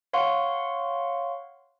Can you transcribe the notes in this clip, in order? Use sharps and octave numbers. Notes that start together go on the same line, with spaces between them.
C#5 F5 F#5 C6 C#6